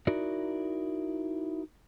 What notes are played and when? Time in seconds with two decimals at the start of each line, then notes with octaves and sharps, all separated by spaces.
0.07 D#4 E4 F#4 A#4 D5